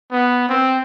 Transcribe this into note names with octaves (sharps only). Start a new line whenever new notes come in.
B3
C4